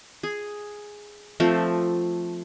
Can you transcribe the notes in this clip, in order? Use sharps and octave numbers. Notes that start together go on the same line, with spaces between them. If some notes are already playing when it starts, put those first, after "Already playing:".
G#4
F3 A3 C4